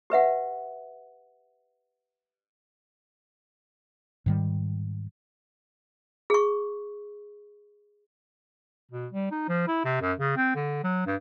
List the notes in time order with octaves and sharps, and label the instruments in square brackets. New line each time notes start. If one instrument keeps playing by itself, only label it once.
[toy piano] G4 B4 E5 F#5
[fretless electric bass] G#2 D#3 G3
[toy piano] G#4 C#6
[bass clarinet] B2
G3
D#4
F3
E4
C3
F#2
C#3
C4
D3
F#3
G2